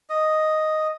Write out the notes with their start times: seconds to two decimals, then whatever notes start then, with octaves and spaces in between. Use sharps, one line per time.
0.10 D#5